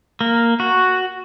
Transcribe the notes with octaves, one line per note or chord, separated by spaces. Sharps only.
A#3
F#4